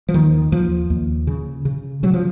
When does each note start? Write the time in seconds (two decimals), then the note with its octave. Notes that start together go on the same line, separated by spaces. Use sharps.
0.09 F3
0.14 D#2 D#3
0.52 D#2 F3
0.90 D#2
1.27 C#3
1.65 C#3
2.03 C#3 F#3
2.14 F3